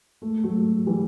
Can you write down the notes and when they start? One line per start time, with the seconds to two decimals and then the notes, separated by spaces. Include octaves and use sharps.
0.22 A3
0.44 F#3 A3
0.86 E3 G3